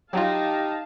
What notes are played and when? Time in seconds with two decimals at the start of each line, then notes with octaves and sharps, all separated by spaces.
0.13 F#3 D#4 F4 G4 F5 A5